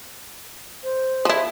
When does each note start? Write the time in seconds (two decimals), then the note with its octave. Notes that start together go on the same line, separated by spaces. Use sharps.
0.84 C5
1.25 F3 E4